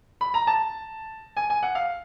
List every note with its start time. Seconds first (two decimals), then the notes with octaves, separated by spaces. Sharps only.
0.21 B5
0.34 A#5
0.47 A5
1.37 G#5
1.50 G#5
1.63 F#5
1.75 F5